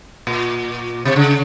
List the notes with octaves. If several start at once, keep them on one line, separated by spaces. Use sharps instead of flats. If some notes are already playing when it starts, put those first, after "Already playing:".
A#2
C3
C#3